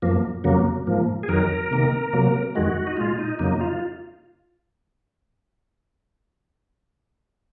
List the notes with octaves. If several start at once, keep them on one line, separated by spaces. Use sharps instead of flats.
F#2 F3 A#3
F2 C#3 F#3 A#3
G#2 F3 A#3
G#4
F2 D#3 F#3 A#4
C3 D#3 A#3
C3 F#3 A#3
F2 D#3 G#3 F#4
D#4
A#2 G#3 F4
D#4
F2 C#3 F#3 A#3 D#4
D#4
F4